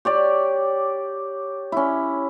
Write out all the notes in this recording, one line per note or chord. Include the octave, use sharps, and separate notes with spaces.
G4 C#5 D5
C#4 E4